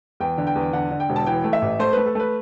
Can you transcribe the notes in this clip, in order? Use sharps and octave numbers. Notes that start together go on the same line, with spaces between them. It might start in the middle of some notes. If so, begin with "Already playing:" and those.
E2 G5
D3
G5
E2
D3 F#5
D3
G5
E1
A5
E3 G5
A3
E5
A1
A3 C5
A3 B4
A4
A3 B4